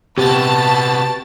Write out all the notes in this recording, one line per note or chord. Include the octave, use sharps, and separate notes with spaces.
C3 B3 G4 A5 A6